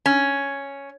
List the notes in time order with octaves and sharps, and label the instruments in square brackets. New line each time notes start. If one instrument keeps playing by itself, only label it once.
[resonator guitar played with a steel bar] C#4